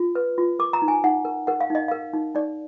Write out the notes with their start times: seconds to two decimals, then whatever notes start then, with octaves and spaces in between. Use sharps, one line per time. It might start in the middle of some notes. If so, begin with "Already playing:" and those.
Already playing: F4
0.15 B4
0.38 F4
0.59 A#4 D6
0.73 A#5
0.82 D#4
0.88 G#5
1.04 D#4 F#5
1.25 A#4
1.47 A#4 F#5
1.61 F5
1.70 D#4 D#5
1.88 A#4 F5
2.13 D#4
2.35 D#4 D5